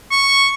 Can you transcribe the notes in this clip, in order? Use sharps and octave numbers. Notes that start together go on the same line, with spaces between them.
C#6